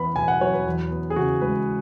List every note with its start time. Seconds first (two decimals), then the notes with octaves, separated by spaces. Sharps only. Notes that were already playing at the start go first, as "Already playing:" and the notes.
Already playing: E2 B3 B5
0.16 B2 G#5
0.28 F#5
0.41 F#3 C#5
0.54 B4
0.66 E2
0.91 B3
1.10 G#4
1.16 C#3 F#4
1.41 G#3 B4